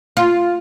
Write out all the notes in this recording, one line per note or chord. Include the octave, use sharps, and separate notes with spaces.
F4